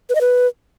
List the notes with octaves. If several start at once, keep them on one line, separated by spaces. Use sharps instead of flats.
B4
D#5
B4